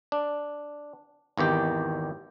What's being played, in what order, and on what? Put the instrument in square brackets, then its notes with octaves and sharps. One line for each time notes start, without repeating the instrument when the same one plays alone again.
[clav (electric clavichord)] D4
G#1 E2 D#3 G4